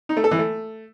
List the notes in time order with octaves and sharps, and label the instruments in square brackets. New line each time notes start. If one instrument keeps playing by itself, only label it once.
[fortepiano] D#4
A3
A4
E3
A3